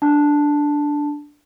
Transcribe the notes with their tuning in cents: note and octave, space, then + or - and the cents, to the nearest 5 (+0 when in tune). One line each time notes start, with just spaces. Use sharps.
D4 +0 A5 +0